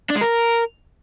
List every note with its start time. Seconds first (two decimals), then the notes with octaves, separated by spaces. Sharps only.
0.10 D4
0.16 G#3
0.21 A#4